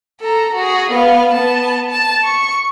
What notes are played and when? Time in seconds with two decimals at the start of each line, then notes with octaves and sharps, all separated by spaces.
0.21 A4 A#5
0.55 F#4 G#4
0.91 B3 F5
1.33 B3 A5
1.90 A5
2.24 C#6